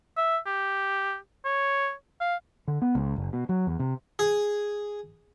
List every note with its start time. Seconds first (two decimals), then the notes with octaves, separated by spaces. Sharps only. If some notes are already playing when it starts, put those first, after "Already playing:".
0.17 E5
0.46 G4
1.45 C#5
2.21 F5
2.68 D3
2.82 B3
2.95 C#2
3.16 F#1
3.33 B2
3.49 F#3
3.67 E2
3.80 C3
4.19 G#4